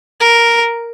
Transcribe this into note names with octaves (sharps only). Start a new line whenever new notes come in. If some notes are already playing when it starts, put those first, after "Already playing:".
A#4